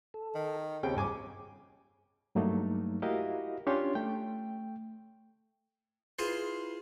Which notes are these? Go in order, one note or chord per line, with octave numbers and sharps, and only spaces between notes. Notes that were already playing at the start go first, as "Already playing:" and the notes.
A4
D#3
D#2 C#3 C4 G4 C#5 G5
G2 C#3 G#4 C#5 G#5 D6
G2 F#3 A3 A#3 D#4
E4 F#4 G4 A#4 D#5 F5
C#4 D4 F4 G4 C#5 C6
A3 G5
E4 F4 G#4 B4 C5